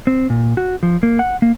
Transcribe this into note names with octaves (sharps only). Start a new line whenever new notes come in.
C4
A#2
F#4
F3
A#3
F#5
A#3